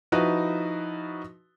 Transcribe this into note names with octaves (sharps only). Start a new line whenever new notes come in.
F3 D#4 E4 F#4 B4